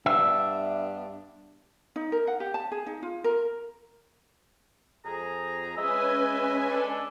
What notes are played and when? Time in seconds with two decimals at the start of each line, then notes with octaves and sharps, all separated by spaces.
0.06 G2 B3 D4 E5
1.96 D#4
2.12 A#4
2.27 F#5
2.40 G4
2.54 A5
2.72 G#4
2.86 D#4
3.03 F4
3.24 A#4
5.05 F2 G#4 A#5
5.77 G#3 C#4 B4 D#5 E5 G#5
6.70 G#3 D4 A4